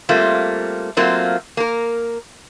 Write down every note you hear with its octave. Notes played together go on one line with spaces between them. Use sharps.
G3 A3 A#3 C4 F4
F#3 A3 A#3 C4 F4
A#3 A#4